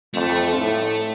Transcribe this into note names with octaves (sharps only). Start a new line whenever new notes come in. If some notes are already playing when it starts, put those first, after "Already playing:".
F2 A3
A2